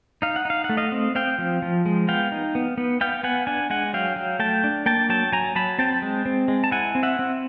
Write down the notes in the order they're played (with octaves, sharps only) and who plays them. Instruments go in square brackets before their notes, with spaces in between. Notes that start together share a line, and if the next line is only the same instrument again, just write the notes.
[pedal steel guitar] D#4 F5
F#5
D#4 F5
F#5
A3
D#5 F5
C4
C4 F5 G5
F3
F3
G#3
B3 F5 G5
D#4
B3
B3
B3 F5 G5
B3 F#5 G#5
D4 F#5 G#5
G#3 F#5 G#5
F#3 F5 G5
F#3
A3 G5 A5
D4
A#3 G5 A5
F#3 G5 A5
F#3 G#5 A#5
F#3 A5 B5
C4 G5 A5
G#3
C4
G#3
A5
E4 F#5 G#5
C4
E5 F#5
C4